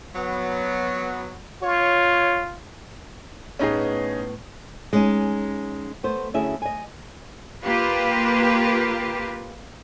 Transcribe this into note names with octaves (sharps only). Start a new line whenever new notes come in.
F#3 B3
F4 C#5
A2 B3 C#4 D#4 G#4 B4
G#3 C#4 D#4
A3 B3 C5
D2 C#4 E4 G#4 E5
D#5 G#5
A#3 F4 G4 B4